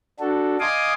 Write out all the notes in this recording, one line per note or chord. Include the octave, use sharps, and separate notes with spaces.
D4 F#4 A4
D#5 F5 G#5 C6 D6 D#6